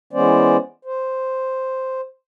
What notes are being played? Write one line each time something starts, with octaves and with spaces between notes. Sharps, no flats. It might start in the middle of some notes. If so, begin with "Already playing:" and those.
E3 G#3 B3 C#4 C5 D5
C5